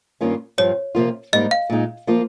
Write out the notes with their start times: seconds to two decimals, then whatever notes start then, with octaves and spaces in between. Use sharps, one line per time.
0.21 G2 D#3 A#3 C#4 F4
0.58 G2 F3 C4 C#5
0.95 C3 F3 A#3 F4
1.33 G#2 G3 A#3 D#4 D#5
1.51 F5
1.70 A#2 G#3 D#4
2.07 F3 A#3 F4